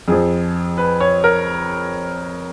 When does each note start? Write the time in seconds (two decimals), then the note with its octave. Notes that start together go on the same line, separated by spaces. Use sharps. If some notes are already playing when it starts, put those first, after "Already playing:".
0.08 F2 F3 G#4
0.78 B4
1.00 C#5
1.24 A#4